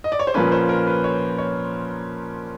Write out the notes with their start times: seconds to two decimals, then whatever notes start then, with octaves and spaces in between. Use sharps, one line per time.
0.04 D#5
0.12 D5
0.19 C#5
0.27 C5
0.34 A#2 F3 A#3 C#4 B4
0.52 C5
0.69 A#4
0.87 B4
1.04 C#5
1.38 C#5